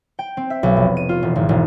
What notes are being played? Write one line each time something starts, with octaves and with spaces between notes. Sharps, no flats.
G5
C4
E5
B1
F1
D#7
F4
E1
G#1
E1